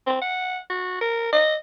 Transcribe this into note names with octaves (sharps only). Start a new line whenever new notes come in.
C4
F#5
F#4
A#4
D#5